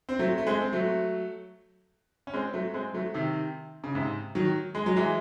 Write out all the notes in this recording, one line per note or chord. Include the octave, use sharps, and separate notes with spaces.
C4
F#3 A3
A3
G#3 C4
C4
F#3 A3
C#4
G#3 C4
F#3 A3
G#3 C4
F#3 A3
C3 D#3
C#3
G#2 C3
D#3 F#3
G#3
F#3
E3 G#3